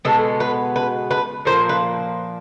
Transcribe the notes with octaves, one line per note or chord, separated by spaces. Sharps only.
B2 G#3 B3 A4
B4
B4
B4
A#2 F3 A#3 C5
B4